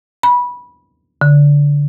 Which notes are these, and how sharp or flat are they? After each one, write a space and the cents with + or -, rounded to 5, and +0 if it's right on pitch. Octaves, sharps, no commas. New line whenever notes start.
B5 -15
D3 -20